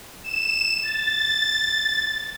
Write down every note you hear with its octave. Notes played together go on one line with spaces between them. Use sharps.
E7
A6